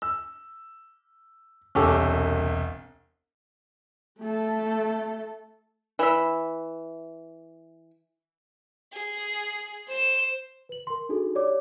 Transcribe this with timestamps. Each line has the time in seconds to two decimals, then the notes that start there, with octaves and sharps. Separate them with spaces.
0.02 E6
1.75 E1 C2 C#4 G4 A4
4.20 A3 A4
5.99 E3 E5
8.93 G#4
9.88 C5 E7
10.69 B4 F#7
10.87 A#4 C6
11.09 D4 D#4 F#4 G#4 A4
11.35 G4 C#5 D5 D6